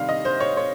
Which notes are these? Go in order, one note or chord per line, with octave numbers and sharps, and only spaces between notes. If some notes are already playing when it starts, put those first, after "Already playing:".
Already playing: C3 D#3 G3 F5
D#5
C5
C#5
C#5